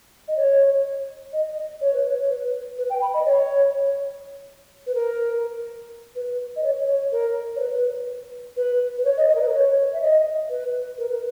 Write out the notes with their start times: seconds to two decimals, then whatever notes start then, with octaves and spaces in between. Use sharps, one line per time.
0.28 D#5
0.37 C#5
1.33 D#5
1.81 C#5
1.94 B4
2.06 C#5
2.29 B4
2.78 B4
2.90 G5
3.02 B5
3.14 D#5
3.26 C#5
4.87 B4
4.95 A#4
6.15 B4
6.56 D#5
6.63 C#5
6.88 C#5
7.12 A#4
7.56 C#5
7.60 B4
8.57 B4
8.98 B4
9.05 C#5
9.17 D#5
9.29 D#5
9.35 A#4
9.41 B4
9.53 C#5
9.93 E5
10.01 D#5
10.49 B4
10.98 A#4
11.09 B4